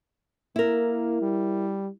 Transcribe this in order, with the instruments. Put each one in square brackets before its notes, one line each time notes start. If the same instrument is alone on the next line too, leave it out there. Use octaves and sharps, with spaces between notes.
[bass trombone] A#3 [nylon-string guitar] E4 A#4
[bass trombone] G3